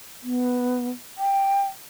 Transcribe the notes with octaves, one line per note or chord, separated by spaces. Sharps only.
B3
G5